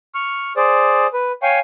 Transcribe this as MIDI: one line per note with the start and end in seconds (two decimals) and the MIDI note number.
0.15 0.53 85
0.15 0.53 89
0.57 1.07 68
0.57 1.07 72
0.57 1.07 74
1.13 1.32 71
1.42 1.59 73
1.42 1.59 77
1.42 1.59 79
1.42 1.59 80
1.42 1.59 85